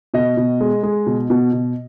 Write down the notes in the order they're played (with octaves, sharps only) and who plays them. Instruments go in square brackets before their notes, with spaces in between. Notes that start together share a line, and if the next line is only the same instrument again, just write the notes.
[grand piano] B2 D#5
B2
G#3
G#3
B2
B2
B2